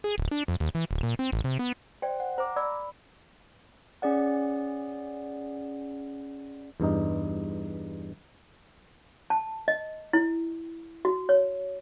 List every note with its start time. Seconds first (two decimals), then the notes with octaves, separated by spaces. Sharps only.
0.04 G#4
0.18 D1
0.31 D4
0.48 F2
0.60 D#2
0.75 E3
0.91 D1
1.03 A#2
1.19 C4
1.32 A1
1.44 C3
1.59 B3
2.02 C5 D5 G5
2.20 F#5
2.38 C5 A#5 D6
2.56 D5 B5 E6
4.02 C#4 G#4 D5 F#5
6.80 E2 G2 D#4
9.30 A5
9.68 D#5
10.13 E4
11.05 F#4
11.29 C#5